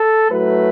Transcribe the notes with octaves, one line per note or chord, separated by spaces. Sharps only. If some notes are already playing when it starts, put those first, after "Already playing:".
Already playing: A4
A2 F#3 A3 B4